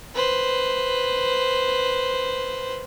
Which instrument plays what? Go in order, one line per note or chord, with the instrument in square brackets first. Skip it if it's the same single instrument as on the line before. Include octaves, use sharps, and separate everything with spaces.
[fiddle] B4 C5